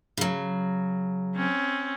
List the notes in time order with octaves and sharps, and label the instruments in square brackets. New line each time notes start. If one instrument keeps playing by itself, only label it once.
[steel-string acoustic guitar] C#3 F#3
[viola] C4 C#4